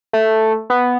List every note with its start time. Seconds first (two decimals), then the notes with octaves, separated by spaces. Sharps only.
0.13 A3
0.70 B3